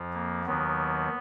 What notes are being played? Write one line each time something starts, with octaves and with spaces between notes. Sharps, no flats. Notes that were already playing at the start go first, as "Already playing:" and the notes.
Already playing: F2 F3
A#3
D#2 D#3 F#3 B3